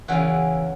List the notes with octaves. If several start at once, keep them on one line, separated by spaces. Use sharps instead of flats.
E2 C#3 E3 F#4